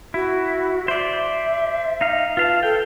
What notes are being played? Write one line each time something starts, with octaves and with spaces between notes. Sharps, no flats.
E4 F#4
C5 D5 E5
D#4 F5
F4 B4 F5 A5
A4 G5